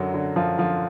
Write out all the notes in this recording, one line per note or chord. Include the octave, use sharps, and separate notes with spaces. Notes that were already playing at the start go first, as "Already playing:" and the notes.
Already playing: F#2 D3 F#3 F#4
D3
F#2 F3 F4
D3 F3 F4